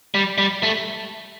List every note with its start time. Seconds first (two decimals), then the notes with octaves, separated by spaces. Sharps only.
0.14 G3
0.38 G3
0.63 A3